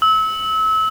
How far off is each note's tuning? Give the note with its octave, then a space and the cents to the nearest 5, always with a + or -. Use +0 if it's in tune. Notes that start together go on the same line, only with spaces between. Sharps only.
E6 -30